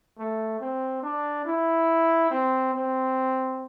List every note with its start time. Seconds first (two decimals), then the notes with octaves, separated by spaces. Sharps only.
0.18 A3
0.60 C4
1.03 D4
1.45 E4
2.31 C4
2.73 C4